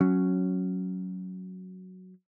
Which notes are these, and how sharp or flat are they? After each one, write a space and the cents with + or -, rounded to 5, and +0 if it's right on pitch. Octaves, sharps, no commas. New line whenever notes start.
F#3 +0 C#4 -5